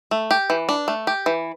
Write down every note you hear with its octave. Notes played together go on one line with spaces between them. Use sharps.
A3
G4
E3
D4
A3
G4
E3